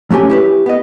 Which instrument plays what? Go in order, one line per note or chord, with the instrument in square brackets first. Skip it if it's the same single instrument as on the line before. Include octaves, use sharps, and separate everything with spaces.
[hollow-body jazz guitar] F#3 A3 C#4 G4 G#5
E4 G4 B4
B3 D#5